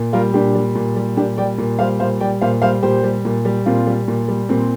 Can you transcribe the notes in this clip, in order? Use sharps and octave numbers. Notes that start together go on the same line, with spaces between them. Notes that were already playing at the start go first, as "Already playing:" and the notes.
Already playing: A#2
G3 F4 A#4
A#2 D4 G4
G3
A#2
G3
A#2 D4 G4
G3 D5 G5
A#2
G3 C5 F5
A#2 C5 F5
G3 D5 G5
A#2 C5 F5
G3 C5 F5
A#2 G4 C5
G3
A#2
G3
A#2 C4 F4
G3
A#2
G3
A#2 C4